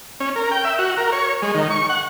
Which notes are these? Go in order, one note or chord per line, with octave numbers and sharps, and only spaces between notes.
C#4
A#4
G5
E5
F#4
A#4
C#5
G#3
D#3
C#6
F#5